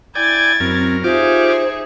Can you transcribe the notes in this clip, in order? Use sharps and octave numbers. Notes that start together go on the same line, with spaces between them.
E4 D5 G5 G#5 G#6 A6
F#2 C4 A#4
D#4 F4 G4 G#4 C5 E5 D6 F6